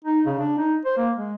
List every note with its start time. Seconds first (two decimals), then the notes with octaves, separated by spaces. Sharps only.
0.04 D#4
0.26 C#3
0.39 D4
0.58 D#4
0.85 C5
0.97 A#3
1.16 G#3